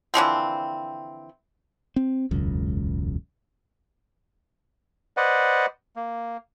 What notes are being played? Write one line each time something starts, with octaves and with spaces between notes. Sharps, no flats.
D3 E3 F3 C4
C4
E1 C#2 F#2
B4 C5 D5 D#5 F#5
A#3